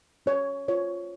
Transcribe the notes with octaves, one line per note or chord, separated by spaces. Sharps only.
C#4 C#5
F4 C5 C#5